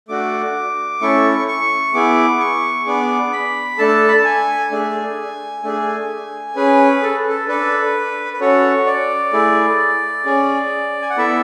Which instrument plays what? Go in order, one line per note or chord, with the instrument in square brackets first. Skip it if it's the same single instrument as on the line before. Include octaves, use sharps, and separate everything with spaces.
[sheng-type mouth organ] A3 D4 F#4 D6
A3 C#4 E4 A4 C#6
C#6
B3 E4 G#4 D6
C#6
B3 D4 G#4 D6
B5
A3 D4 A4 A5
B5
A5
G#5
A3 D4 G#4
A3 D4 G#4
C#4 G#4 B4
A4
A4
D4 A4 B4
B4
C#4 F#4 A4 C#5
D5
A3 E4 G#4
C#4 G#4
G#5
F#5
B3 E4 A4 E5